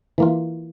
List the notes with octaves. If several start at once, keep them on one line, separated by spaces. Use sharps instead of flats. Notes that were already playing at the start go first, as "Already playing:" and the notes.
E3 A#3 F4